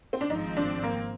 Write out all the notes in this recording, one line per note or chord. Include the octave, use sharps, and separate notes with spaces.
C4
D4
G#1 G#2 F3 C4 D#4
D4
A#3